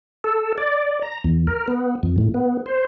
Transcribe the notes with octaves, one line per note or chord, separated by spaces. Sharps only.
A4
D5
A#5
E2
A#4
B3
F2
A2
B3
C5